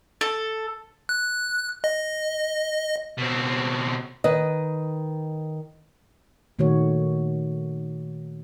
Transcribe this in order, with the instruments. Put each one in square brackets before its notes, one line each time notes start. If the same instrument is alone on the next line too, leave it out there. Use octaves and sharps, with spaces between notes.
[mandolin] A4
[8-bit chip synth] F#6
D#5
[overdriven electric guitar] B2 C4
[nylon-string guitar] D#3 B4 D#5
[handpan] A#2 D#3 A3 F#4 C#5